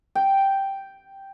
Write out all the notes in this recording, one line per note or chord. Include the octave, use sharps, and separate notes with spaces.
G5